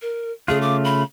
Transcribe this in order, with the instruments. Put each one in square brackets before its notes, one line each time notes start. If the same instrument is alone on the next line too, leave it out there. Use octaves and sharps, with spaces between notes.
[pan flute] A#4
[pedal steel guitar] C#3 A3 F4 [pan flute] G#4
[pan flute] D6
B5